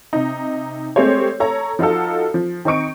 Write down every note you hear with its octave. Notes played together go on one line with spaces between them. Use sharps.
C3 D#4
G#3 A3 C4 G4 C5 C#5
A4 C#5 A#5
F3 D#4 F4 F#4 A4
F3
D#3 C4 D#4 C#6 D7